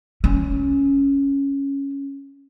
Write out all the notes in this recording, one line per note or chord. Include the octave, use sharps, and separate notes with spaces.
C#4